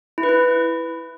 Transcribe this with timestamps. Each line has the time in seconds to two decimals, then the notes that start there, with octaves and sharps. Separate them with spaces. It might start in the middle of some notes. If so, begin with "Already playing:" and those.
0.18 E4
0.23 B4
0.29 E4